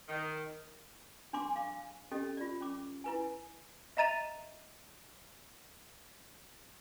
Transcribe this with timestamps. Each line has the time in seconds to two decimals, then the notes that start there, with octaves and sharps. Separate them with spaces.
0.08 D#3
1.33 D4 G#5 C6 D6
1.56 F5 D6
2.11 C#4 G4 A4 D#5
2.37 F4 D5
2.61 C#4 D6
3.04 E4 B4 G#5
3.97 D#5 E5 A#5 A6 D#7 F7